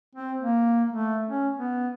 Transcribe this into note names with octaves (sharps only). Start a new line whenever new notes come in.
C4
A#3
A3
C#4
B3